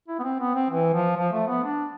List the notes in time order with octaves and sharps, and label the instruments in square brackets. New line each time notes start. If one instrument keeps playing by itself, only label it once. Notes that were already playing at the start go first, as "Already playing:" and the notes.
[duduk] E4
B3
C4
B3
C4
E3
F3
F3
A3
B3
D4